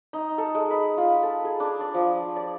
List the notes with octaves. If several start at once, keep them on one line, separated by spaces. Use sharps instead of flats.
D#4
A4
G#3
B4
F4
A4
G#4
D4
D5
F3
D5